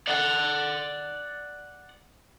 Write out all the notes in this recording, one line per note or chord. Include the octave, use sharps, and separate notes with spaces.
D5 F#5